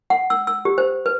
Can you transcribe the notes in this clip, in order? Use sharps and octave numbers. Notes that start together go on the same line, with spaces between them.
F#5
E6
E6
G4
C5
B4